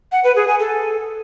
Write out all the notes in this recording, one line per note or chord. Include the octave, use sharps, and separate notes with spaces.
F#5
B4
G#4
G#5
A4